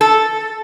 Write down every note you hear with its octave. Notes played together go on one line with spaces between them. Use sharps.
A4